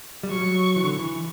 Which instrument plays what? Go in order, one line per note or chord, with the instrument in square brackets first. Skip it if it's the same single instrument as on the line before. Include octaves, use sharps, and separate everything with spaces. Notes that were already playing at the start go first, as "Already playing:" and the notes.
[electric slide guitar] G3
[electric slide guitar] F#3 [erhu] C#6
[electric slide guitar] E3
D3
E3